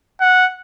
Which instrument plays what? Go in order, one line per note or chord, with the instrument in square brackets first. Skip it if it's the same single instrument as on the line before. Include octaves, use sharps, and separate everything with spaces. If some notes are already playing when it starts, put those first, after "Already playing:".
[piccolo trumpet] F#5